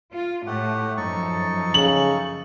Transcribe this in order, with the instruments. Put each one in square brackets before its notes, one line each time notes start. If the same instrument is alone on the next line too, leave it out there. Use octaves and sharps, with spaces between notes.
[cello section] F4
[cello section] A2 [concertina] A3 G4 F#5
[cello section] F#2 F3 [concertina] D#4 A4 C#6
[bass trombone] C#3 [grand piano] F#7